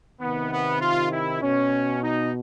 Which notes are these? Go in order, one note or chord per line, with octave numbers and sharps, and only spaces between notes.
C3 D#3 B3
B3
F4
E4
B2 C#4
D#4